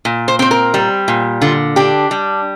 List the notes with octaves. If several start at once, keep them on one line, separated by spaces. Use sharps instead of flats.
A#2
C5
C4 C5
A#4
G3
A#2
D3 F4
D4 G4
G3